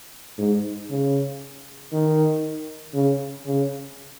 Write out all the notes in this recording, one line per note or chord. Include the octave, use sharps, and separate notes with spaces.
G#2
C#3
D#3
C#3
C#3